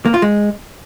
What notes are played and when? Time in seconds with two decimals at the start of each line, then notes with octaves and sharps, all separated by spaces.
0.05 A#3
0.14 F4
0.22 G#3